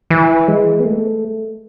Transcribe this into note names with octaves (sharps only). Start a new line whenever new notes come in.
E3
G#3
B3
A3